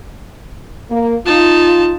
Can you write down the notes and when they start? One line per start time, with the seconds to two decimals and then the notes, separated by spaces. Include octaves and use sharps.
0.90 A#3
1.26 D#4 F4 A5